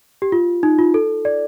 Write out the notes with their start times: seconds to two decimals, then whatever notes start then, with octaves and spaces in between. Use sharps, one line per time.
0.22 G4
0.32 F4
0.63 D#4
0.79 F4
0.94 A4
1.25 D5